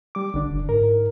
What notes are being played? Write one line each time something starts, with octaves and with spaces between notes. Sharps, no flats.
G3 D6
A1 D3 D4
F#1
G#2 A#4